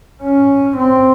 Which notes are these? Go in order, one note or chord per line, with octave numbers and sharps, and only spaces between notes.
C#4
C4